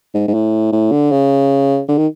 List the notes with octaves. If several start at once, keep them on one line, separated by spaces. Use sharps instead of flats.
G#2
G#2
A2
A2
D3
C#3
D3
D#3